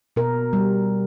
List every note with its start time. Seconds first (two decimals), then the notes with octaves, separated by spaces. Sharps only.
0.16 B2 A#4
0.53 G3